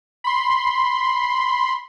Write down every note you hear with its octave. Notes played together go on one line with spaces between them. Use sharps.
B5 C6